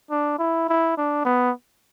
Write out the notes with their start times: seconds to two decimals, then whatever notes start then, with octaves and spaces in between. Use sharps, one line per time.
0.11 D4
0.39 E4
0.69 E4
0.98 D4
1.25 B3